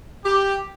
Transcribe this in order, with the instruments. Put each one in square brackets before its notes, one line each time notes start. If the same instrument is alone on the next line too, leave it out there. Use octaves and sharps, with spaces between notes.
[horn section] G4